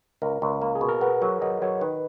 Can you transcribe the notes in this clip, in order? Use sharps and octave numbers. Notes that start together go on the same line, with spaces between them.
C#2 A#4
C#2
A#3
G#4
B2
A#4
B3 B4
F#3 C#5
F#3 D#5
F#3 C#5
D#3 B4